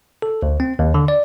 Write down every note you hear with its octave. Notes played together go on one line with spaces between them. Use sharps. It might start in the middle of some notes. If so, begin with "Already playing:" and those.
A4
D2
C4
D#2
D3
D5